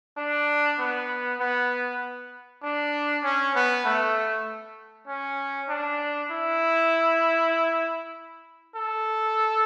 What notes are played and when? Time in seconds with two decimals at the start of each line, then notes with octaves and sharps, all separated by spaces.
0.17 D4
0.79 B3
1.40 B3
2.63 D4
3.24 C#4
3.55 B3
3.85 A3
5.07 C#4
5.69 D4
6.31 E4
8.76 A4